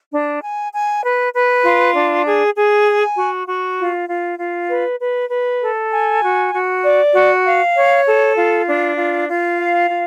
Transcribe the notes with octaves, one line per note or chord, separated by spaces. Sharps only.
D4
G#5
G#5
B4
B4
F4
D4
G#4
G#4
G#5
F#4
F#4
F4
F4
F4
B4
B4
B4
A4
G#5
F#4
F#4
D5
F#4
F5
C#5
A4
F4
D4
F4
F4
F5
F4